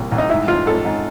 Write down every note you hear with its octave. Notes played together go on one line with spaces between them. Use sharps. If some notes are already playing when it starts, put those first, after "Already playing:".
Already playing: C2 A#2
C2
D#4
G#2 E4
G#2 F4
G#2 A4
G#2